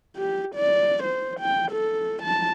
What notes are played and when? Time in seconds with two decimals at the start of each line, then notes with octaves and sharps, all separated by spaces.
0.17 G4
0.55 D5
1.03 C5
1.40 G5
1.72 A4
2.23 A5